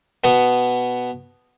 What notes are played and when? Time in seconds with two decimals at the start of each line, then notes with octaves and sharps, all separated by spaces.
0.24 B2 B3